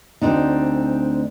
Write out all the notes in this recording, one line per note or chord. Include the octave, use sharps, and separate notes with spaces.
D2 C4 D4 D#4